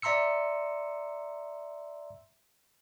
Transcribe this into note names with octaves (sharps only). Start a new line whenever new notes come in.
D5 E5 A#5 C6 E6 C#7